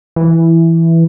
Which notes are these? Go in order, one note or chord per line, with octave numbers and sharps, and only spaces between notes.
E3